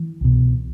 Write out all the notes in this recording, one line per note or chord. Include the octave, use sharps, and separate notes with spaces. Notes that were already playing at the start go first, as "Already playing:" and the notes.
Already playing: E3
C2 B2